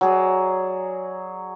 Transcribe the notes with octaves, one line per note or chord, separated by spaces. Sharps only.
F#3 G#4 D5